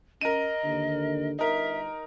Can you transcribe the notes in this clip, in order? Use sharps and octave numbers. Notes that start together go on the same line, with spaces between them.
C#4 A#4 D#5 D#7
D#2 D3
G1 D#4 A#4 E5